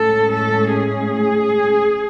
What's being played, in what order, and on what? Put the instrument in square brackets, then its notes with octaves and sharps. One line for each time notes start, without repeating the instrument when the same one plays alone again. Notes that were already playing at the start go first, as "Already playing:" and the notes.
Already playing: [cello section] A2 G#3 C#4 A4
A4
G#4